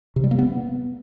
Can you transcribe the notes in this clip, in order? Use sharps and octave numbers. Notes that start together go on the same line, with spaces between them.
C3
G3
A#3
B3